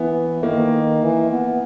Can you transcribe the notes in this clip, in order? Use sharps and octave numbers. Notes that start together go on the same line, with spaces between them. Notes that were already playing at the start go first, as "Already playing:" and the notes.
Already playing: E3 B3
D#3 A#3
E3
B3